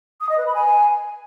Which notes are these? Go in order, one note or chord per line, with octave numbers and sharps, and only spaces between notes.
D#6
D#5
B4
B5
G#5